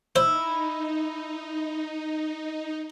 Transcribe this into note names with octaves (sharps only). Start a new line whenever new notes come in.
D#4 E4 C5 E6